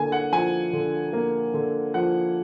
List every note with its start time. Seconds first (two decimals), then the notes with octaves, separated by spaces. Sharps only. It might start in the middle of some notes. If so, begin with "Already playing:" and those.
Already playing: D3 A#3 G#5
0.12 F#5
0.32 F3 G#5
0.73 D3
1.13 A#3
1.54 D3
1.94 F3 F#5